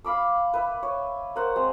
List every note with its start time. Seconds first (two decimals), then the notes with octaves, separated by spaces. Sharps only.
0.04 F5 B5 D6 E6
0.54 B4 E5
0.83 C#5
1.36 A#4 C5 F#5
1.56 G#3 C4